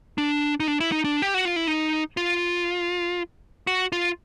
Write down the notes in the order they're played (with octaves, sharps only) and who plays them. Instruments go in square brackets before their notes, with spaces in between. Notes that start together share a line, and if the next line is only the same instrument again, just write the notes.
[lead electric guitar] D4
D#4
D4
E4
D#4
D4
G4
F#4
F4
E4
D#4
F4
F#4
F4